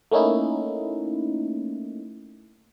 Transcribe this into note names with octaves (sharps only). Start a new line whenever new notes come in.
A3 A#3 C#4 D#4 E4